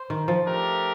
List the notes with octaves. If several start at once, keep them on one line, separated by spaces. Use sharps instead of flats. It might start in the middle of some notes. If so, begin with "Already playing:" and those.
Already playing: C5
D#3
F3
A3 D4 G4 A#4